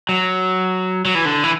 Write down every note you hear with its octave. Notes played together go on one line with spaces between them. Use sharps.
F#3
F#3
E3
D3
E3